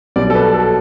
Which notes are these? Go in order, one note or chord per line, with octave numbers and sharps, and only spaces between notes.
B1 B2 G3 D5
A4
B4
A4